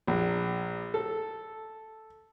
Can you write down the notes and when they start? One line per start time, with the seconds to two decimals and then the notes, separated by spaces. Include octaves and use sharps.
0.07 A#1
0.94 A4